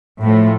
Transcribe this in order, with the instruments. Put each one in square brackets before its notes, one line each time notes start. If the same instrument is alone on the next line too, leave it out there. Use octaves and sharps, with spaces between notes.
[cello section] A2 F3 A3